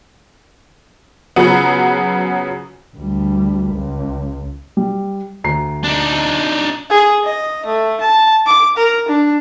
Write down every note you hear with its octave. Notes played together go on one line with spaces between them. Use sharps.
C#3 F3 F#3 B3
D2 G3
C#2
G3
D2 A#5 C7
D4 D#4
G#4
D#5
A3
A5
D6
A#4
D4